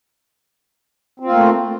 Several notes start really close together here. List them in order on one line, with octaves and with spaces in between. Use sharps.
C4 F4 A#3 A3